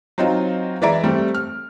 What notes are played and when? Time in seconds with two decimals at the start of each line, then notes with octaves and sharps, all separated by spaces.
0.18 F#3 C4 D#4 F4
0.82 E3 G#3 D5 E5 A#5 D7
1.04 G3 A3 C4
1.34 F6